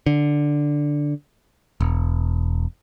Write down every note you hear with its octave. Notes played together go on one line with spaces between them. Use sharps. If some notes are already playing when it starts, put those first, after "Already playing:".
D3
E1